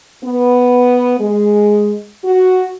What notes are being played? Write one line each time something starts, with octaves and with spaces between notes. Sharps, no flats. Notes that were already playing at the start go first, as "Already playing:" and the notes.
B3
G#3
F#4